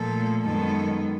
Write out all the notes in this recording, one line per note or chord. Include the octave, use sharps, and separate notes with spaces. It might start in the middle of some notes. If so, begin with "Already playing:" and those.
Already playing: A#2 F3 A3 A4
F#2 D#3 G#3 B3 A4